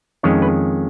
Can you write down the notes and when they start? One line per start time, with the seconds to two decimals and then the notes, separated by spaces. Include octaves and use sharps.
0.23 F2 D#3 G#3 C#4 C#5
0.42 B4